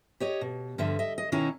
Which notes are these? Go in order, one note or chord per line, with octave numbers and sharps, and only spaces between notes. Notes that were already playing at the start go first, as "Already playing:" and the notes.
G4 C#5 D#5
B2
G2 D3 F3 E5
D#5 E5
D#5
B2 D#3 C#4 D#4 E4 A#5